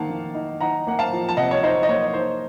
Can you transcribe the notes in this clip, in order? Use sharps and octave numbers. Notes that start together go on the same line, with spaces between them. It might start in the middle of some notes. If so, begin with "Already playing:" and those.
Already playing: D#3 A#3 F5 F#5 A5
D#3
D#4
D#4 F#5 A#5
A#3 F#5
F5 A5
F3
A5
C3 D#5 F#5
C#5
D#4 C5 D#5
D#5
A#3 C#5
D#4 C5